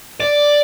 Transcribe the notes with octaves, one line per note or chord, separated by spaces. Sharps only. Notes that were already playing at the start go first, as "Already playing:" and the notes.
D5